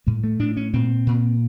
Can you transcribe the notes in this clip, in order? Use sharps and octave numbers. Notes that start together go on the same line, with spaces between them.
A2 G#3
A3
A2 D4
C#4
A#2 C4
A#2